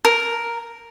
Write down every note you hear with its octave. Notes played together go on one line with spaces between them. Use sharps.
A#4